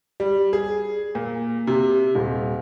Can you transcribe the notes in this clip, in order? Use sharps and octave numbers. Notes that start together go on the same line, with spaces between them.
G3
G#4
A#2
C3
D#1